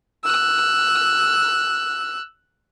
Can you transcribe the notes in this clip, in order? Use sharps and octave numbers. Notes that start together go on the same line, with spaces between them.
E6 F#6